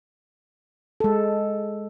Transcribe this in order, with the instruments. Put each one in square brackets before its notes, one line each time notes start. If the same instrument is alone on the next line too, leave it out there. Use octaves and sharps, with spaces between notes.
[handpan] G#3 A4